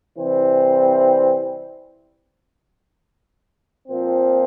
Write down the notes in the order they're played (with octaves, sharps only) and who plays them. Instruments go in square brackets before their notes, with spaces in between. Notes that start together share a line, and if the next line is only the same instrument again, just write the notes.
[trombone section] C3 E3 G3 C4
A#2 F3 C4